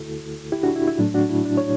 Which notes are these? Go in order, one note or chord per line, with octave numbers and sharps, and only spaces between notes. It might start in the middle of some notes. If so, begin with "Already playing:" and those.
Already playing: D2 D3 A3 E4 F#4 A4
E4 G4
D4 F#4
E4
E4
A2 F#3 A3 D4
D4 F#4
E4
D4
C#5